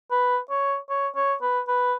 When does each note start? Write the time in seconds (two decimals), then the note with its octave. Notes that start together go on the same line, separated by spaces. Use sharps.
0.11 B4
0.50 C#5
0.90 C#5
1.16 C#5
1.42 B4
1.68 B4